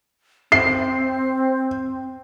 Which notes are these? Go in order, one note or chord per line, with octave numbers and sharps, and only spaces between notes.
C4 C7